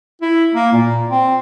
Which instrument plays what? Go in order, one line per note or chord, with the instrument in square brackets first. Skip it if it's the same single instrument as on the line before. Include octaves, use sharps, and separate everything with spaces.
[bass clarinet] E4
A#3
A#2
C4